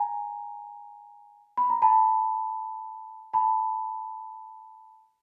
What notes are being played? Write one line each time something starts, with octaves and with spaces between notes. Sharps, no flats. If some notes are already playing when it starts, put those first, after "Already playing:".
Already playing: G#5 A#5
B5
A#5
A5 B5
A5 B5